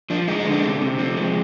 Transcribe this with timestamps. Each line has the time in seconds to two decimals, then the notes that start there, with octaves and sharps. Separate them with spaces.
0.10 F3 D4
0.28 G#3 D#4
0.40 D#4
0.45 D3
0.51 D4
0.64 C3
0.81 C3
0.98 F3 C4
1.17 G#3